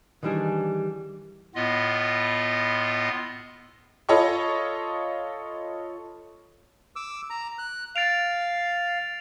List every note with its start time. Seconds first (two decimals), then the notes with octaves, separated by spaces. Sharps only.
0.23 D#3 E3 G3 D4 G#4
1.55 A2 B3 F4 D#5
4.09 F4 A4 C#5 D#5 B5 C#6
6.96 D6 E6
7.30 A#5
7.58 F#6
7.96 F5 A6 D7 F7